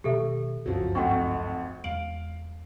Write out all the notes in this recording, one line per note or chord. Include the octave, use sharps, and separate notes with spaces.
B2 D#3 G#3 G4 A4 E5
G1 C#2 F#2 F3 F#3
G#1 F2 A3 F#5 G5 C#6
E2 G#3 F5 D7 F#7